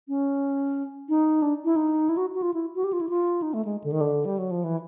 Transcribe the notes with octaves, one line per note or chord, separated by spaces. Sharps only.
C#4
D#4
D4
E4
D#4
E4
F#4
F#4
F4
E4
F#4
G4
F4
E4
F4
D#4
A3
G#3
D3
D#3
D3
G3
F#3
F3
E3